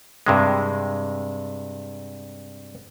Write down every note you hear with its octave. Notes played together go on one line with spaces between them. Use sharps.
G2 C3 G#3